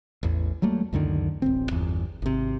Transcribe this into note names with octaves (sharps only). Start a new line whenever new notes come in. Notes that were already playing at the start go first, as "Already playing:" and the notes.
A1 E2
F#3 G3 A3 A#3
C#2 F#2 D3 D#3
D1 A1 C4
G1 E2
G#1 C3